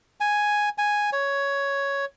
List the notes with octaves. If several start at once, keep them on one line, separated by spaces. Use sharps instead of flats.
G#5
G#5
C#5